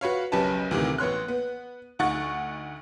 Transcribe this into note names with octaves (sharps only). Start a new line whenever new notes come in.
F#4 B4 C#5 F5
F#1 B1 C#4 G4 B4 A5
D2 C3 D#3 E3
A1 B3 C#5 C6 F#6
B3
D2 D#4 F#5 C#6 A6